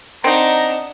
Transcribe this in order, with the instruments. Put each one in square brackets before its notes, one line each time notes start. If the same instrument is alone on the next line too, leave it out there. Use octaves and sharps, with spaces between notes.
[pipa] C4 D#4 [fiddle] D4 F#5 [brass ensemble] A#5